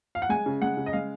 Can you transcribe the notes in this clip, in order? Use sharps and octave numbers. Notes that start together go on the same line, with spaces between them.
F5
F#5
G#3 G#5
C#3
G#3 F#5
C#3
D#5
G#3 F5